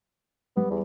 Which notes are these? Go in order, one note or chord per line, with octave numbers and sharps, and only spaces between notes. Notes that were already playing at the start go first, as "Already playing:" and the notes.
G3 B3
E2